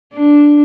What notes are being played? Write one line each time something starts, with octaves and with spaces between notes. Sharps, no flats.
D4